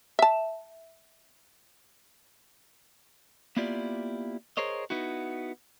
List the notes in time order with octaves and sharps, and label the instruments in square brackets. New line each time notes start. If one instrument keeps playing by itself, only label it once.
[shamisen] E5 A5
[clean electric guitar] A#3 B3 E4 F4 G4 D5
G#4 A#4 C5 C#5 D#5
B3 D#4 E4 F#4